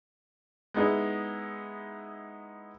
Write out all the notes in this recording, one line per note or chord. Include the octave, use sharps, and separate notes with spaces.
G#3 B3 D#4 E4